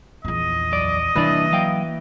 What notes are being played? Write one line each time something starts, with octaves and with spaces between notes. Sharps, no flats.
A#1 E2 D#5
F#2 D5
C2 E3 A#3 D4 D5
F#3 F5 G5